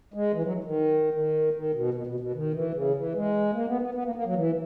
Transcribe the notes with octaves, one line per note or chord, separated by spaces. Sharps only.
G#3
E3
F#3
D#3
D#3
D#3
B2
B2
B2
B2
D#3
E3
C#3
E3
G#3
A#3
B3
B3
B3
A#3
A#3
F#3
E3